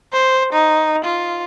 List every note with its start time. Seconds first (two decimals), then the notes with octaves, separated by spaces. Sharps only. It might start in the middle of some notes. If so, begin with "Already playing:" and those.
0.13 C5
0.53 D#4
1.05 F4